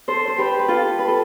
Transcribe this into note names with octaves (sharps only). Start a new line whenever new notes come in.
A4 C5
C5
G4 B4
B4
F4 A4
B4
A4